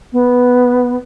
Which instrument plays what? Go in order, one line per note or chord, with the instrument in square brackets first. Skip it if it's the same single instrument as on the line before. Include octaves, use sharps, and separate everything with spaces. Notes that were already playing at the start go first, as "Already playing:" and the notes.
[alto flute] B3